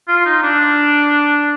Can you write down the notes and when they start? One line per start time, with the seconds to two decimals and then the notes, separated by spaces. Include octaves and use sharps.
0.08 F4
0.25 D#4
0.43 D4